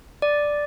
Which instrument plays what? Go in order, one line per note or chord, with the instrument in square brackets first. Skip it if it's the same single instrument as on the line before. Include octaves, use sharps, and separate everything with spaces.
[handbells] D5